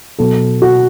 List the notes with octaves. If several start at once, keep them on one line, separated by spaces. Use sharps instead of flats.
B2 F#3 A4
F#4